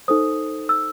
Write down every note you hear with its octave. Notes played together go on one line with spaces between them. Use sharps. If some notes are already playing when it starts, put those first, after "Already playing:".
D#4 A4 C5 D#6
E6